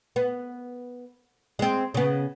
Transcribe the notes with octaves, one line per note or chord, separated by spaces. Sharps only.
B3
G#3 C4
C#3 B3